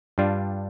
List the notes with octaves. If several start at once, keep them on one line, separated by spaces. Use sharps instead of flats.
G2 G3 D4 F4